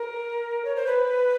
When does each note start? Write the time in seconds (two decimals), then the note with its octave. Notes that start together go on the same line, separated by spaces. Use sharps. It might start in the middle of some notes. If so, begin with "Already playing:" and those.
Already playing: A#4
0.65 C#5
0.76 C5
0.87 B4